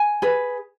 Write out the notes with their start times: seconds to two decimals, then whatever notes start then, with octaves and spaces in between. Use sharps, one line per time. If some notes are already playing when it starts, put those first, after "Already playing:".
Already playing: G#5
0.22 G#4 B4